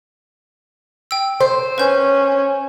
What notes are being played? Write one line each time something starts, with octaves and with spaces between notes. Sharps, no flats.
G5 E6
C5
C#4 B4 G6